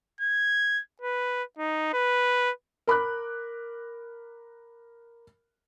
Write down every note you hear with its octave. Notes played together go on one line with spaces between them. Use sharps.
G#6
B4
D#4
B4
A#4 B5 D6 F#6